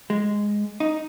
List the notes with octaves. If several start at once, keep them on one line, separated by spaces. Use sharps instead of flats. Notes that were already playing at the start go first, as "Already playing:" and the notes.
G#3
D#4